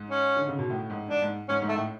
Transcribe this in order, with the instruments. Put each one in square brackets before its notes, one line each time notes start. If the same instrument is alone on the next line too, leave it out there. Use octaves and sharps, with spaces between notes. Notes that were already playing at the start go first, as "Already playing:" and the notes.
Already playing: [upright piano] G#2
[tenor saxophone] C#4
[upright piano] D3
C#3
B2
A2
G#2
[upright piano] G#2 [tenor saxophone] D4
[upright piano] G#2
[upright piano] G#2 [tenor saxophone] C#4
[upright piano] G#2
[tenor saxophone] A3
[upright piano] A2